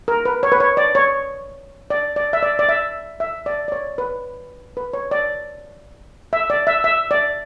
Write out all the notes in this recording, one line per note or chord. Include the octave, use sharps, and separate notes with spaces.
A#4
B4
C#5
B4
C#5
D5
C#5
D5
D5
E5
D5
D5
E5
E5
D5
D5
C#5
B4
B4
C#5
D5
E5
D5
E5
E5
D5